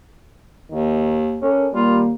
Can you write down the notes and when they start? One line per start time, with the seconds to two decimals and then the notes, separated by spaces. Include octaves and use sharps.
0.70 D#2 D#3
1.42 C#4 A4 A#4
1.73 D#2 G3 A#3 F4